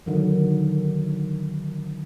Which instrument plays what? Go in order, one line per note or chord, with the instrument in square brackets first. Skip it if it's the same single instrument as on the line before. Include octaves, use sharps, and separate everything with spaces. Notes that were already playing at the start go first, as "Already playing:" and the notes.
[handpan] D3 D#3 F#3